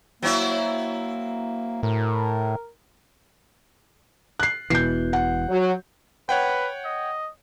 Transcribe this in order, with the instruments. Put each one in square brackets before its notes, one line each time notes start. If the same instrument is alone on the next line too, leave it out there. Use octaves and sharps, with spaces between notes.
[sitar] F#3 C4 E4 [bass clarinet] A#3
[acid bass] A2 [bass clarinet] A#4
[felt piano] F#6 C7
[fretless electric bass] E1 B2 E3 [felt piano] G6 C7
[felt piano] F#5
[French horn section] F#3
[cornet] B4 [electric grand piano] C#5 F#5 G5
[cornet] D#5